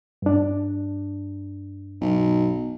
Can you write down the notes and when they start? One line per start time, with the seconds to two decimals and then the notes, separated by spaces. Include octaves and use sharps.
0.22 G2 D4
2.01 B1